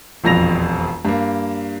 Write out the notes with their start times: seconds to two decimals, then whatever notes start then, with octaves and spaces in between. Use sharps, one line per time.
0.24 E1 A#1 F2 A#6 F7
1.05 G2 A#3